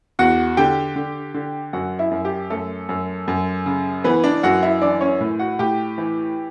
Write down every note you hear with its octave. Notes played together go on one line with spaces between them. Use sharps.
E2 F#4 F#5
D3 G4 G5
D3
D3
F#2 F#4 F#5
E4 E5
F#2
G4
F#2 A3 A4
F#2
F#2
C#3
E3 B3 B4
D4 D5
F#2 F#4 F#5
E4 E5
E3 D4 D5
C#4 C#5
A2
F#4 F#5
A2 G4 G5
E3